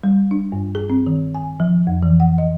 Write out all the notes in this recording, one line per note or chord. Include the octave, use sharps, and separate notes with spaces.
G3
D4
G2
G#4
C4
D#3
G#5
F3
F2
E3
F#5
D#5